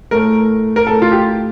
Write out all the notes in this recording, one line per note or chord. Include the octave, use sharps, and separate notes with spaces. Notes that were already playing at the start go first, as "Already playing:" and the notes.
A2 A3 A#4
A#4
A2 A3 A4
F4
G4